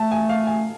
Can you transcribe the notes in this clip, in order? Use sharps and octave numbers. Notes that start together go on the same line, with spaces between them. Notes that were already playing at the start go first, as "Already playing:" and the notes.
Already playing: A3 A5
G#5
F5
G#5